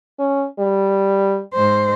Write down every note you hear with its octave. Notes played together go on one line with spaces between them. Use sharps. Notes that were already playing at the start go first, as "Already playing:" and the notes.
C#4
G3
G#2 C5